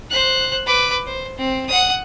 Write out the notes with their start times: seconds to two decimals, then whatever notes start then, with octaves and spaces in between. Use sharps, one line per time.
0.10 C5 F#6
0.66 B4 D6
1.06 C5
1.38 C4
1.68 F#5 D#6